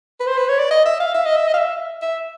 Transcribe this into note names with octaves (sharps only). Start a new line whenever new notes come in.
B4
C5
B4
C#5
D5
D#5
E5
F5
E5
D#5
E5
D#5
F5
E5
E5